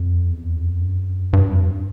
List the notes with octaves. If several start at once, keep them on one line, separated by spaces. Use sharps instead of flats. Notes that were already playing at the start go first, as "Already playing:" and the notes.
Already playing: F2
E2
F2
F#2
G2
F2